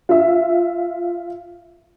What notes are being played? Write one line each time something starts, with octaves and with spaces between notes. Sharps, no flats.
F4 E5